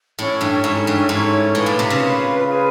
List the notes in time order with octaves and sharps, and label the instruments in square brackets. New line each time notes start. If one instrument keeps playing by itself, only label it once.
[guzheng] A2 [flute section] C#4 E4 A4 C#5
[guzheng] G2
[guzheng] G#2 [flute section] C#4 E4 A4 C#5
[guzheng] G2
[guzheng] G#2 [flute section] C#4 E4 A4 C#5
[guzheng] A2 [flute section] F4 G#4 B4
[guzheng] A#2
C3
C#3
[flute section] F4 G#4 B4
F4 G#4 B4